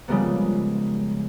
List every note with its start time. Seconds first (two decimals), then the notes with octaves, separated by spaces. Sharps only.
0.08 C#3 F3 G3 G#3 A#3 B3